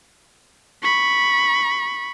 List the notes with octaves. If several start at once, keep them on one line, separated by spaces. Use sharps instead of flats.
B5 C#6